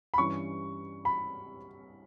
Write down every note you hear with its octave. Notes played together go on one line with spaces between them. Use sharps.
B5
G2 E3 G3 C#4 C#6
B5